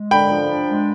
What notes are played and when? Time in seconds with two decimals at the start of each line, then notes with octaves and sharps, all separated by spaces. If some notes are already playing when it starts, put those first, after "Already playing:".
Already playing: G#3
0.11 D3 G5 B5
0.30 F3
0.48 D4
0.66 G#3